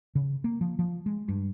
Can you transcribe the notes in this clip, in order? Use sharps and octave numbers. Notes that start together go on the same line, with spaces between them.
C#3
A#3
F3
F3
G#3
G2